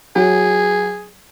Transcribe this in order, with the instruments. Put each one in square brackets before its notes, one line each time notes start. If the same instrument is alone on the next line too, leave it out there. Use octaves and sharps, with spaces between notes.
[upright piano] F#3 [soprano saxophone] G#4